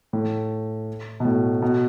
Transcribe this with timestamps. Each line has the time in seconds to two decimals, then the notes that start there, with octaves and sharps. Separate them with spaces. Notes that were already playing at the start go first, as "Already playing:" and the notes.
0.13 A2
1.20 B2
1.25 A2
1.62 B2